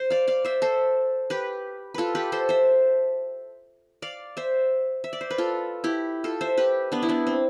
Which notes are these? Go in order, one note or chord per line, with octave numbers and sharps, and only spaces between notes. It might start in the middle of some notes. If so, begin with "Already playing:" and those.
Already playing: C5
D5 F5
D5 F5
C5 E5
A4 C5
G4 B4
F4 A4 B4
G4 B4
A4 C5
C5 E5
D5 F5
C5 E5
E5
D5
C5
B4
F4 A4
E4 G4
F4 A4
C5 E5
G4 B4
B3 D4
E4
B3 D4
C4